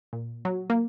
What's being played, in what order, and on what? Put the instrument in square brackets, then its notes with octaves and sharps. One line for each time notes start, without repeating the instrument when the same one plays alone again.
[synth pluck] A#2
F#3
A#3